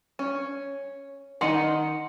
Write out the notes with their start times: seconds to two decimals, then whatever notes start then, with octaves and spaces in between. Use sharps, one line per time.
0.19 C#4
1.41 D#3 D#4 F#5 C6 C#7